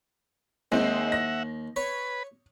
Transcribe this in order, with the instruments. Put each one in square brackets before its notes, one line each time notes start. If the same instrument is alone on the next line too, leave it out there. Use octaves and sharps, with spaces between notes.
[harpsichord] D#2 [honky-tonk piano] G#3 C4 D#4 [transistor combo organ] E5 F#5
[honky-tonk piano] A#6
[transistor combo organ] B4 [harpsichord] C#5